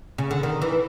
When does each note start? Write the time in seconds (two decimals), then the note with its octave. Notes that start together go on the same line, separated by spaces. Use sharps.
0.18 C#3
0.31 D3
0.43 D#3
0.62 E3